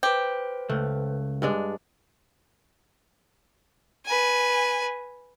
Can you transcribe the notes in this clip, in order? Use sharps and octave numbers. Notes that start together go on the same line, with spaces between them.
G4 B4 C5
C#2 A3
G2 G#3 D4
B4 G#5